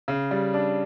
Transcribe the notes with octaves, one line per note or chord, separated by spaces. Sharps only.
C#3
G3
D4